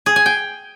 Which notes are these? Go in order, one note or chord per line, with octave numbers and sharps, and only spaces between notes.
G#4
G#5
G5